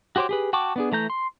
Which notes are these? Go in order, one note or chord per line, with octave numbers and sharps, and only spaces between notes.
F#4 G4 C5 C#5 D6
G4 G#4 B4
F#4 G5 A5 C#6 D6
B3 D4 G#4
E3 A3 A#5 G6
C6